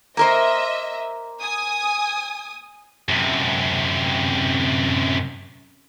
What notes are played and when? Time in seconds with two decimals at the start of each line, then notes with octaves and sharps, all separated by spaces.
0.17 A#3 A#4 C5 D#5 E5
1.41 G#5 D#6
3.09 F#2 C3